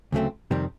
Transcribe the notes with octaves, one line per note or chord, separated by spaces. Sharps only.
D2 C#3 F#3 A3 C4
F2 C3 D#3 G3 C4